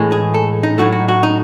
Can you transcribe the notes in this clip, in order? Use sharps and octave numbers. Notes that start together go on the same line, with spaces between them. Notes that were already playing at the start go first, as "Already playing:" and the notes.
Already playing: A2 E3 G#3
G#4
A4
D#4
A2 F#3 A3 F#4
F#4
F#4
D#4